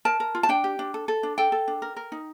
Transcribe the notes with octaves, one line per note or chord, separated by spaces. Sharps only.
A#4 A5
A#4
F4
A5
D4 G5
G4
D4
A4
A4
D4
A4 G5
A4
D4
A#4
A#4
D#4